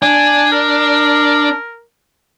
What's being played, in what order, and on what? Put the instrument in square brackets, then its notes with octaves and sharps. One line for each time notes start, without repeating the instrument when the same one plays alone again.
[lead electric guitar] D4 [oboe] G#5
[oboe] A#4